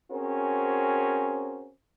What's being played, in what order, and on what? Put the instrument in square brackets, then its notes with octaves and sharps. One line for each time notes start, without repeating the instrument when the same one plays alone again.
[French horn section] C4 C#4 F#4 G#4 A#4 C5